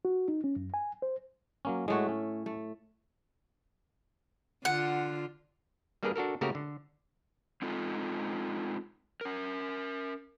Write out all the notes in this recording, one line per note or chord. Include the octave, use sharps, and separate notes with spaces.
F#4
D#4
C#4
F#2
G#5
C5
F#3 A#3 C#4
A2 G#3 A3 E4 F#4
C#4
A3
D3 F4 F#5
G3 A#3 D4 G#4 A#4 B4
D4 F#4 A4 A#4
C#3 A3 A#3 F#4 G4 A#4
D3
G#3 C4 D#4 F4 A4
C#4 A#4